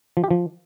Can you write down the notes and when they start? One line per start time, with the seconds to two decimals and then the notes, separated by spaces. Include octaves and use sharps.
0.17 F3
0.24 G4
0.31 F3